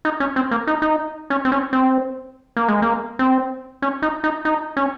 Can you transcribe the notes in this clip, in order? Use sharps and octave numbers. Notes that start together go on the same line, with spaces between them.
D#4
C#4
C4
A#3
D#4
D#4
C#4
C4
C#4
C4
A#3
G#3
A#3
C4
C#4
D#4
D#4
D#4
C#4